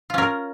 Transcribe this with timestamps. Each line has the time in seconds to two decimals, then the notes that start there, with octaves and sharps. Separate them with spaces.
0.10 F4
0.14 C#4
0.18 A#4